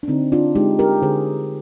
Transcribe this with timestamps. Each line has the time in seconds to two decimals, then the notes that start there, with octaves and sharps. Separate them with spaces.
0.03 D4
0.08 D3 C4 D#4
0.32 D4 F4
0.55 G#3 D#4 G4
0.79 G4 A#4
1.02 D3 G#4 C5